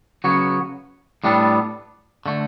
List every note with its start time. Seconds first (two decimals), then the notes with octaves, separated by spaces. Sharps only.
0.24 C#3 F#3 B3 F#4 C#5
1.24 A2 G3 B3 D4 A4
2.26 D3 A3